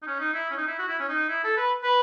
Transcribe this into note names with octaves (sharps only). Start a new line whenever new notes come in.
D#4
C#4
D#4
E4
C#4
D#4
E4
F#4
E4
C#4
D#4
E4
A4
B4
B4